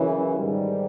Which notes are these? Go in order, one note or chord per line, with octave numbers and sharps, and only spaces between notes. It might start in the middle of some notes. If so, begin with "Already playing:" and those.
Already playing: F#2 C#3 E3
G#2 D#3 G3